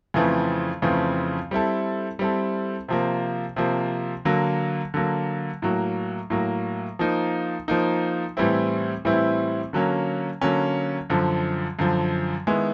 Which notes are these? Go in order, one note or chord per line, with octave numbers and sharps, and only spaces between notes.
F2 C#3 E3 A3 C4
F2 C#3 E3 A3 C4
G3 C4 E4 A4
G3 C4 E4 A4
C3 F3 A#3
C3 F3 A#3
D3 F#3 A#3
D3 F#3 A#3
A2 F#3 A#3
A2 F#3 A#3
F3 A#3 D#4
F3 A#3 D#4
A2 E3 G3 C4 E4
A2 E3 G3 C4 E4
D3 F#3 A#3 C#4
D3 F#3 A#3 C#4
F#2 D3 F3
F#2 D3 F3
D#3 G#3 B3 E4